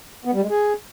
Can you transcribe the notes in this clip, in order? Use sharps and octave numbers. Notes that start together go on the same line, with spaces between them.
B3
G3
G#3
G#4